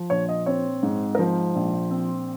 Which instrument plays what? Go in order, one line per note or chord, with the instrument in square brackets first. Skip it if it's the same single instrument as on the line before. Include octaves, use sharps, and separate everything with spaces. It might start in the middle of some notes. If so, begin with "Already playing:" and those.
Already playing: [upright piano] F3
A#1 C#5
D#5
C4 C#5
G#2
A#4
F3 C5
A#1
C4